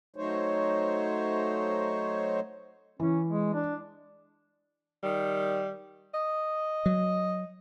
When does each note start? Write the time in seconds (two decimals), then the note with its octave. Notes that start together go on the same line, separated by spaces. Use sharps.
0.16 F#3 A3 D#4 C5 C#5
3.00 E3 C#4
3.28 G#3
3.54 D4
5.03 D#3 G3
6.14 D#5
6.86 F#3